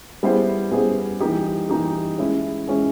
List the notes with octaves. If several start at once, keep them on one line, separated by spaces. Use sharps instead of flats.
G3 B3 E4 G#4 C5
G3 B3 E4 G#4 C5
E3 G3 A#3 D#4 G4
E3 G3 A#3 D#4 G4
G#3 C#4 E4
G#3 C#4 E4